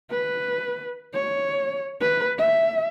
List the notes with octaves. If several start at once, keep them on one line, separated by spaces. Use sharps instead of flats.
B4
C#5
B4
E5